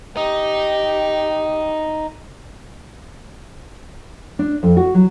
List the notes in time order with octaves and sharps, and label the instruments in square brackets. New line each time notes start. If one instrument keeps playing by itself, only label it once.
[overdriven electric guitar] D#4 [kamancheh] G4
[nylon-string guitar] D4
F2
F#4
F#3